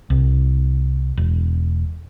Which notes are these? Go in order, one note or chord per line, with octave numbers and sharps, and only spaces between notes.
C2
E1